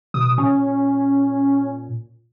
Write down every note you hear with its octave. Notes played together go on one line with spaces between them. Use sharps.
B2 D#6
A#2 C#4